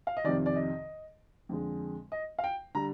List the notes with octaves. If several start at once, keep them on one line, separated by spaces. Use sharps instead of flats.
F5
D#5
F2 C3 D#3 D5
D5
D#5
F2 D3 G#3
D#5
F5
G5
D3 G3 A#5